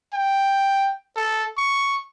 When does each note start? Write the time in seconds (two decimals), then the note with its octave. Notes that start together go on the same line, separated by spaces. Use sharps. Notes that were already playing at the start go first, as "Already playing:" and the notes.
0.14 G5
1.17 A4
1.58 C#6